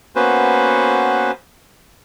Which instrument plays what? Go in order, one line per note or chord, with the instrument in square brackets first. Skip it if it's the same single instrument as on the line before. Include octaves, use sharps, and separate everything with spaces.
[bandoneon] A#3 B3 C#4 F#4 B4 C5